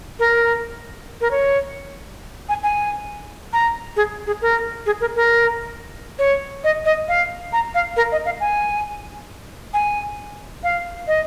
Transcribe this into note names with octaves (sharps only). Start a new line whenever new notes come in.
A#4
A#4
C#5
G#5
G#5
A#5
G#4
G#4
A#4
G#4
A#4
A#4
C#5
D#5
D#5
F5
A#5
F5
A#4
D#5
F5
G#5
G#5
F5
D#5